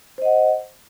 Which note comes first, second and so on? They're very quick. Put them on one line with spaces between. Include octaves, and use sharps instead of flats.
C5 D#5 F#5